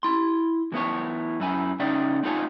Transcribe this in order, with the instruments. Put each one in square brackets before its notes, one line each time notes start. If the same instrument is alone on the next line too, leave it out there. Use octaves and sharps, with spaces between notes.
[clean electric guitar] E4 C6
E3 B3 E4 C#5
F#2 E4 G#5
C#3 D#4 D5 E5 G5
C4 D#4 F4 A4 C#5 G#5